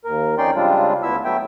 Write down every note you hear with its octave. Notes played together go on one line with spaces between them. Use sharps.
D#2 A#4
F2 C#4 D#4 D5 G5 C6
C#3 G3 G#3 C4 D4 F4
D2 B3 E4 E5 E6
F#3 A3 B3 E5 G5